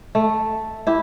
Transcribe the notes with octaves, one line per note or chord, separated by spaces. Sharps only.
A3
E4 G4